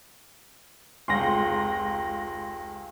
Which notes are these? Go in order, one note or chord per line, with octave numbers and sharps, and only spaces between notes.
F1 C#2 F4 G5 G#5 C6 A#6